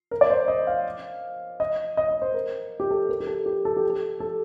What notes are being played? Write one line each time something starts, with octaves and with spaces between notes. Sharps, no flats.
A#4
D5
C5
D#5
F5
D#5
D#5
D#5
C5
A#4
G4
A4
A#4
G4
A4
G4
A4
G4
A4
A4